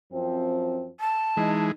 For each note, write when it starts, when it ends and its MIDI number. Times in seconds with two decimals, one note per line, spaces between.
0.13 0.90 42
0.13 0.90 53
0.13 0.90 60
1.00 1.64 81
1.37 1.72 52
1.37 1.72 56
1.37 1.70 63